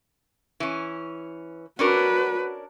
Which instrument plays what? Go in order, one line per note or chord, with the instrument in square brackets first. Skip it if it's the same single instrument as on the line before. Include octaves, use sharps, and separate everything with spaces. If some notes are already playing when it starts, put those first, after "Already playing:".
[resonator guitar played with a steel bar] E3 C#4
[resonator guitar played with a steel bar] C#4 D4 A#4 [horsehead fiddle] F#4 B4